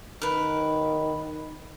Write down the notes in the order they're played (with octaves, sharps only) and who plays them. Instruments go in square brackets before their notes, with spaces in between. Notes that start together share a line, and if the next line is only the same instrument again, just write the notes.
[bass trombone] D#3 [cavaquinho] A#4 B4